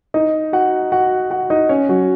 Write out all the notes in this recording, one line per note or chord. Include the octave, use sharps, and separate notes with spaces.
D#4 D#5
F#4 F#5
F#4 F#5
F#4 F#5
D#4 D#5
C#4 C#5
F#3 F#4